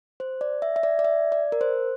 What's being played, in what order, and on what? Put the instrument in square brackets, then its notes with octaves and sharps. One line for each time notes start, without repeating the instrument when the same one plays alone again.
[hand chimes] C5
D5
E5
E5
D5
D5
E5
D5
A#4
C5